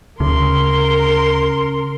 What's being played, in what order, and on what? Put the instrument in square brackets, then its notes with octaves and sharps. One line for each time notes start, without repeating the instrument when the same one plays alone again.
[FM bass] D2 [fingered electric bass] C#3 [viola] A#4 C6